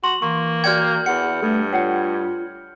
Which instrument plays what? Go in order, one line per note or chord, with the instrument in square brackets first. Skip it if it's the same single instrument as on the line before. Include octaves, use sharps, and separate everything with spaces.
[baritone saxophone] F#4 [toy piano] C6 [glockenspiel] F#7
[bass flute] E3 [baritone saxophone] A#3 [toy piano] C#6
[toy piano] F#4 D5 G5 [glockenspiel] F6 G6 G#6
[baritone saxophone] E2 [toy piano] F#5 [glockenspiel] C#7
[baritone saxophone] G2 [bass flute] A3 [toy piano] A4
[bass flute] F4 [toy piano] C#5 F#5 G5